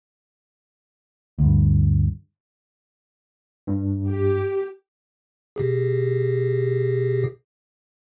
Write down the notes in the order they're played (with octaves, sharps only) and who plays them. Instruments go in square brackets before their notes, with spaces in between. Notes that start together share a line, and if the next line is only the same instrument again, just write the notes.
[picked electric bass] D2 G2
[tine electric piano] G2
[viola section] G4
[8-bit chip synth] B2 G4 G#4